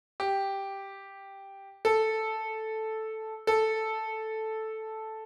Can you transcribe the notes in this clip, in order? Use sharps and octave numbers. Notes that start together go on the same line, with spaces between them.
G4
A4
A4